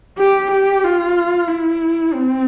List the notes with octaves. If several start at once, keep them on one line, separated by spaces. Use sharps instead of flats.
G4
G4
F4
E4
C4